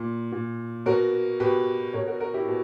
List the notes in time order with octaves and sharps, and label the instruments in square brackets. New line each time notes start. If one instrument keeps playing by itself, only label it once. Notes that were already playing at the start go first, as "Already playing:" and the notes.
Already playing: [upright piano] A#2
A#2
B2 F#4 A#4
B2 G4 B4
B2 A#4 C#5
F#4 A#4
F#4 A#4
E4 G4
B2